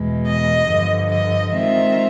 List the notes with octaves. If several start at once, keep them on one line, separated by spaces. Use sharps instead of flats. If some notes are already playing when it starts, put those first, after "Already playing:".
Already playing: E2 B2 G#3
D#5
G2 D3 F3
D#5
D#3 G#3 C4 F4 E5